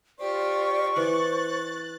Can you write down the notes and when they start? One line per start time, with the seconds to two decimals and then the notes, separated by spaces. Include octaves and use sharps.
0.19 F4 G4 C5 D5 C#6
0.96 E3 C5 D5 F#6 A6